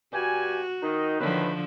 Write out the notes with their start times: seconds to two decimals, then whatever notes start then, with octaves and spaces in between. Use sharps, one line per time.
0.13 G2 F#4 G4 G#5
0.83 D#3 D#4
1.20 A2 D3 D#3 F3 B4